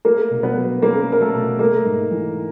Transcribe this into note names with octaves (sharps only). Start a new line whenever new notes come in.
A3 A#3 A#4
B2
B3 B4
F#3
A#3 C#4 A#4
A3
A#4
A3 A4
B2
A3 A#3 A#4
G#2
E3